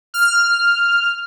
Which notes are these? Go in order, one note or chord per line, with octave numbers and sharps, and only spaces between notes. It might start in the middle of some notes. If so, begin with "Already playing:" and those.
F6